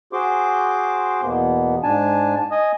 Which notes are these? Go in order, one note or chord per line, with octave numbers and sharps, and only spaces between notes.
F#4 G#4 C5 C6 D6
E2 B2 A#3 B3
G#2 D4 G#5 A5
D#5 G#5 D#6